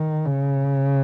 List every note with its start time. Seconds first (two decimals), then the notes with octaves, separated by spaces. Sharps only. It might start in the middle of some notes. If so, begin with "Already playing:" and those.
Already playing: D#3
0.25 C#3